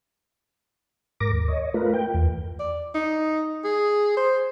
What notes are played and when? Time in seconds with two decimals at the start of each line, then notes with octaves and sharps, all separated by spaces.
1.20 G#2 A#4 D6 A#6
1.33 D#2
1.48 C#5 D#5
1.74 A3 F4 A#4 B4
1.94 G5
2.14 E2
2.59 D5
2.94 D#4
3.64 G#4
4.16 C5